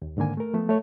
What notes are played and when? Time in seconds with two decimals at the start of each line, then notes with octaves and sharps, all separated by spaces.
0.02 D#2
0.17 G#2 D3 D#3 A#3 G#5
0.37 A3 A#4
0.54 F3 A3 B3
0.69 A3 C#5